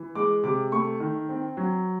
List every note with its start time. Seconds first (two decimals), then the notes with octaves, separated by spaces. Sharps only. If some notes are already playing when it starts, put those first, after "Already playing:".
Already playing: E3
0.15 G#3 D6
0.44 C3 D6
0.72 A3 C#6
1.00 D#3
1.29 C4
1.57 F#3